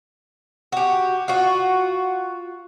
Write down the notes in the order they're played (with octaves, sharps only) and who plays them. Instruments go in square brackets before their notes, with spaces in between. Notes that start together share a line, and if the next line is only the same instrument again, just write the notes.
[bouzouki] F#4 G4
F4 F#4